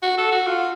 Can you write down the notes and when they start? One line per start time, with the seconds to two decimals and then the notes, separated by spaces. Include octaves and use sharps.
0.02 F#4
0.17 A4
0.32 F#4
0.46 F4